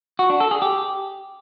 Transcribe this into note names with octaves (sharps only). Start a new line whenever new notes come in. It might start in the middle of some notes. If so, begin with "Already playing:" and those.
F#4
D4
A4
G#4
G4